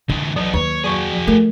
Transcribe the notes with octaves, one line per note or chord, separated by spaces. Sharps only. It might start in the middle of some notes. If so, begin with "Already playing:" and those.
D3 E3 G#3
F#3 B3 D#4
D#2 D#3 C#5
F#3 F#4 G#4 C#6
F3
A3 A#4